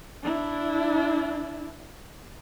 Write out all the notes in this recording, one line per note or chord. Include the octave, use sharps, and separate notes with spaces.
D4 E4